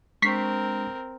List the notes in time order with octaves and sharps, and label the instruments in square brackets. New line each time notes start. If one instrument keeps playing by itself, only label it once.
[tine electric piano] G#3 D4 [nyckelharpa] C4 A#4 [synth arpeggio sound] C#6 B6 C7